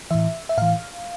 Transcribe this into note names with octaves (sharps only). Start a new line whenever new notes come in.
A2 E3 E5
E5
A2 E3 F5